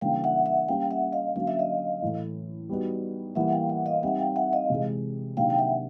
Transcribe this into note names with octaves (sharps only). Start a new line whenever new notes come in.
C#3 E3 G3 A#3 D4 F5 G5
E5 F#5
E5 F#5
G3 A#3 C#4 F5 G5
E5 F#5
D#5 F5
D3 F#3 A#3 C#4 F5
E5
D#5 F5
A2 E3 A3
G3 B3 D#4 F#4
E3 G3 A#3 E5 F#5
F5 G5
E5 F#5
D#5 F5
G3 C4 D#4 E5 F#5
F5 G5
E5 F#5
D#5 F5
C3 E3 G#3
C3 D#3 F#3 A#3 D4 F5 G5
G5
E5 F#5